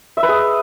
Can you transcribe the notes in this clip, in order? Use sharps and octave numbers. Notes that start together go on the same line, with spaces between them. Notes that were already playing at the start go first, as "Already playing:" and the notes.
E5
B4
G#4